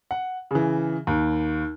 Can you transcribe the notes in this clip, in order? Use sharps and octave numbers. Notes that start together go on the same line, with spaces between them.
F#5
C#3 E3
D#2